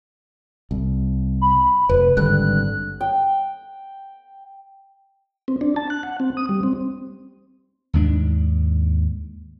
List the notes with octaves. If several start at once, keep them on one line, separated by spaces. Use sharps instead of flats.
C2
B5
F1 B4
G#1 G2 D3 F#6
G5
C4
D4
A5
F#6
F#5
C4
D#6
G3
C4
D#2 G#2 D4